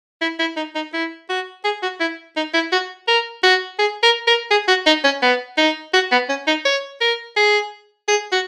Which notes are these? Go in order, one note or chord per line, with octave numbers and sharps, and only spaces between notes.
E4
E4
D#4
D#4
E4
F#4
G#4
F#4
E4
D#4
E4
F#4
A#4
F#4
G#4
A#4
A#4
G#4
F#4
D#4
C#4
B3
D#4
F#4
B3
C#4
D#4
C#5
A#4
G#4
G#4
F#4